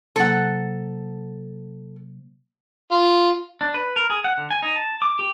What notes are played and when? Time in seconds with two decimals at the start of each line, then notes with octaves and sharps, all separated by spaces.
0.16 C3 F#3 A#3 A4 F#5
2.91 F4
3.61 D4
3.74 B4
3.96 A#4
4.10 G#4
4.24 F#5
4.37 D3
4.51 G#5
4.62 D#4
4.76 A5
5.02 D6
5.19 G4